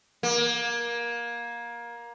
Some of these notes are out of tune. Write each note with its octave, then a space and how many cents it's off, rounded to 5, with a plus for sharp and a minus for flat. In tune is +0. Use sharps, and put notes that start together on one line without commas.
A#3 +20